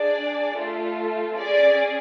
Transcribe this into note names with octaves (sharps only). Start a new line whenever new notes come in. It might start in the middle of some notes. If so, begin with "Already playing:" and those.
Already playing: D4 G#4 D5
A3 F4 A4
C#4 G#4 D5